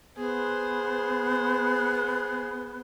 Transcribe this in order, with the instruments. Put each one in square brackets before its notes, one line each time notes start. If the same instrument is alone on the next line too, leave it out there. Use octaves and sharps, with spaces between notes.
[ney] B3 [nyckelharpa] G#4 C5